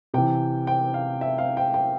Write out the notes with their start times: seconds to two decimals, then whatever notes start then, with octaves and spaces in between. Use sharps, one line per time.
0.14 C3 E3 G5
0.67 G5
0.94 F5
1.21 E5
1.38 F5
1.57 G5
1.74 G5